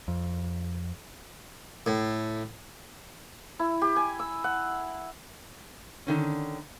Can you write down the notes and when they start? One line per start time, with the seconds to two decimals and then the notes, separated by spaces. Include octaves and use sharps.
0.08 F2
1.86 A2
3.59 E4
3.82 G4
3.96 G#5
4.19 E6
4.44 F#5
6.07 D3 D#3 C#4